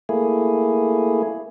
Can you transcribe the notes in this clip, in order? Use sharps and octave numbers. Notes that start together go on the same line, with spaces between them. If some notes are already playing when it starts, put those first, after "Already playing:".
A3 A#3 E4 G#4